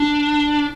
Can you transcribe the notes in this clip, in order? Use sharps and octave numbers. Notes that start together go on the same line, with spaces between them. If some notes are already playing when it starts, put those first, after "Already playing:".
Already playing: D4